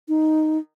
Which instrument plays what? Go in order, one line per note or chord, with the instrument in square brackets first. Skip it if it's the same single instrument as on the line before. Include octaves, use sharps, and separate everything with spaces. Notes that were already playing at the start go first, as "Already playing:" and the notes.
[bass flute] D#4